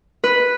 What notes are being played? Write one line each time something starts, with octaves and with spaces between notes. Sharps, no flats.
B4